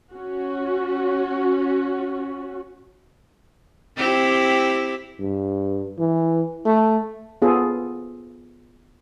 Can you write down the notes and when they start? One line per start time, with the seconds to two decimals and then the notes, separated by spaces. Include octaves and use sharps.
0.13 C#4 F#4
3.97 C4 E4 G4
5.20 G2
5.99 E3
6.66 A3
7.42 B3 F4 G#4 A4